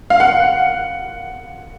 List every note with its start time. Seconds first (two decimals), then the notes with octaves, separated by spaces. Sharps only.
0.10 F5
0.20 F#5